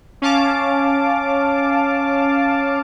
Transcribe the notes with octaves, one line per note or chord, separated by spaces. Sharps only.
C#4 F5 A5 D6